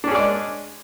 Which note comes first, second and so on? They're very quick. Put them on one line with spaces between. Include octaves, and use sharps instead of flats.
D4 C#4 G#4 D5 G#3